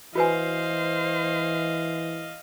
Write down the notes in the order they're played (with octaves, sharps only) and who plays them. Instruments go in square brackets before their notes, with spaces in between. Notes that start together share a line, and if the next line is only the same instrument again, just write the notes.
[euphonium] E3 [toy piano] F#4 B4 G#5 [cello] C5 [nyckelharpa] D#5 F5